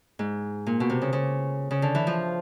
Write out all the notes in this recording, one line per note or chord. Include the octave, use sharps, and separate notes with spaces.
G#2
A#2
B2
C3
C#3
C#3
C#3
D3
E3
F3